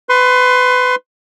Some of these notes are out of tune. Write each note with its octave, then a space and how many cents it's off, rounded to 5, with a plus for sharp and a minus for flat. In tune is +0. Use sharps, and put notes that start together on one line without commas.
B4 +25 C6 +15